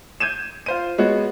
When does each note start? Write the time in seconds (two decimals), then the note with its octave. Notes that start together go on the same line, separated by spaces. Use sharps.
0.20 G6 G#6 D#7 E7
0.66 F4 C5 D#7
0.98 G#3 B3 F#4 C#5